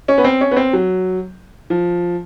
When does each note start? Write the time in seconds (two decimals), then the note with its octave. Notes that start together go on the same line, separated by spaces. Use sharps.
0.08 C#4
0.18 B3
0.24 C4
0.41 C#4
0.51 B3
0.56 C4
0.73 F#3
1.70 F3